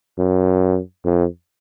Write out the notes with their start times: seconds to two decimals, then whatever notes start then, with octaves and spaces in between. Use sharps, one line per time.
0.19 F#2
1.05 F2